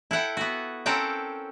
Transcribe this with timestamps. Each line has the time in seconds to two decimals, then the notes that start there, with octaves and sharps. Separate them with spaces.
0.11 E4 A4 F#5 G5
0.37 B3 F#4
0.86 C4 C#4 A4 A#4 F#5 G5